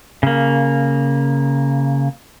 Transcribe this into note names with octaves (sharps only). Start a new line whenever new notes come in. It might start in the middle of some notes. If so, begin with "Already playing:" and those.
C#3 A#3